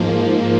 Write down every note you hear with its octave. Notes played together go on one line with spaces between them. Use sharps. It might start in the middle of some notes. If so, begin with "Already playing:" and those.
Already playing: G#2 F3 A#3